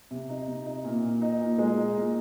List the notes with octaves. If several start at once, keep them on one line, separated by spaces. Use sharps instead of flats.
C3
D#4
C3
D#4
A#2
A#2
D#4
A#2
G#3
D#4
A#2